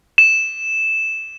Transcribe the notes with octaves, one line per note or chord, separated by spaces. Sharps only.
E7